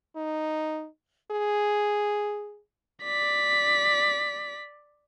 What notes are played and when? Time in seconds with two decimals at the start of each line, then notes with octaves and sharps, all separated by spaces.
0.16 D#4
1.31 G#4
3.04 D5 B6